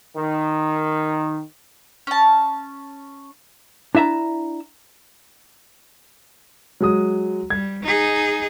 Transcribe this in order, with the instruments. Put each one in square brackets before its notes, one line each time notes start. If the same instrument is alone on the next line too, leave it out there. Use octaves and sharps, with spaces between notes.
[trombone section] D#3
[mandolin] C#4 A5
[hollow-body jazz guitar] D4 E4 E5 A5 A#5
[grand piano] F#3 G#3 D#6
[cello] G3 [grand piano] G#6
[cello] D#4 G#4